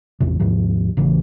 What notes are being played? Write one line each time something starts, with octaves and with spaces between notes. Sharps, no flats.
A1 E2 C3
D#2 G#2 C3 F3
A1 C#3 E3